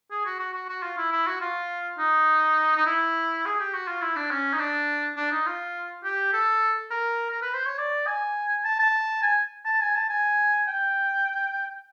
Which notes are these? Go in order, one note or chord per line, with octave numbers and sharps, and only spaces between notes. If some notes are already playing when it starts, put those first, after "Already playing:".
G#4
F#4
F#4
F#4
F#4
F4
E4
E4
F#4
F4
D#4
D#4
E4
G#4
G4
F#4
F4
E4
D4
C#4
D#4
D4
D4
D#4
F4
G4
A4
A#4
A#4
B4
C5
C#5
D5
G#5
A5
A5
G#5
A5
G#5
A5
G#5
G5